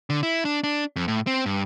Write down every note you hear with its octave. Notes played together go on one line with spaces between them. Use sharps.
D3
E4
D4
D4
F2
A2
C4
G2